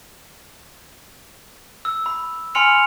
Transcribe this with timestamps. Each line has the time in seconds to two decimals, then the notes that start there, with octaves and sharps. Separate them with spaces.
1.85 E6
2.06 B5
2.55 G#5 B5 C6 F6 C#7 F7